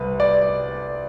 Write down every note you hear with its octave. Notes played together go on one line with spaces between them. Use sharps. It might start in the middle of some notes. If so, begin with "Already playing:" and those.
Already playing: C2 B4
D5